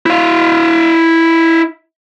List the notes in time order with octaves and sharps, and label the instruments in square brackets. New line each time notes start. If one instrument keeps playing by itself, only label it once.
[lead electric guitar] E4 F5